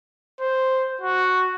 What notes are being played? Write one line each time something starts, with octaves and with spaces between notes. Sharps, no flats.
C5
F#4